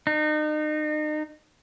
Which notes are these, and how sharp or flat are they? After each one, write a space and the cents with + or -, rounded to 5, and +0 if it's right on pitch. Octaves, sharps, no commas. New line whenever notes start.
D#4 -35